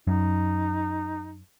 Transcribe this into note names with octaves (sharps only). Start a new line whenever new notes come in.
F#2 D#4